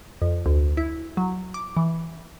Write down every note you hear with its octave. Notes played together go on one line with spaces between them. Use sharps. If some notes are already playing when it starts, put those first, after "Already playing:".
F2
D2
E4
F#3
D6
E3